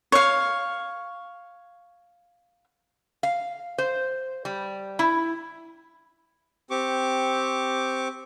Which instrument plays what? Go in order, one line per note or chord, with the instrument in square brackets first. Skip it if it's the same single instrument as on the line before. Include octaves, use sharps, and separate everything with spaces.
[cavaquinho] C#5 F5
[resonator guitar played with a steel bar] F5
C5
G3
E4
[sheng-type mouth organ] C4 G4 C#6 D6